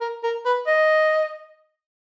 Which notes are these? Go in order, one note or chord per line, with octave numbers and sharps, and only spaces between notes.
A#4
A#4
B4
D#5